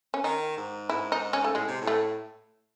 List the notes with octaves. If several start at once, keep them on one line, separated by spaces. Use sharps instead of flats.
C#4
D#3 D#4
G#2
G#2 E4
D#4
C#4
A3
A2 G#3
C3
A2
A3